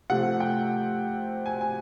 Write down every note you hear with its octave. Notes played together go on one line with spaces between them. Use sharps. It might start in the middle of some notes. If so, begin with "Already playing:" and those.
C3 F3 A3 C4 F#5
G5
G#5
G#5